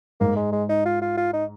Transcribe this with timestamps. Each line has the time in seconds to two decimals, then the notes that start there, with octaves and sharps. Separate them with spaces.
0.21 G#2 A#3
0.36 G#3
0.53 G#3
0.69 D#4
0.86 F4
1.02 F4
1.17 F4
1.33 D#4